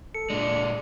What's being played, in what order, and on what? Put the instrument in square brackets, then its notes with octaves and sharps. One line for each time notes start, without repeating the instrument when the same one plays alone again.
[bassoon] A4 [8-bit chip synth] C#7
[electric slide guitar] A#2 G#3 [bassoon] D4